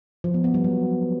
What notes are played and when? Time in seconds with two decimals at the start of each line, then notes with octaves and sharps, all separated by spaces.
0.24 F3
0.34 B3
0.44 B3
0.54 G3
0.64 F#3